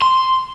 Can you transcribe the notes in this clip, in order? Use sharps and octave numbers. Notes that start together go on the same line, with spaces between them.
C6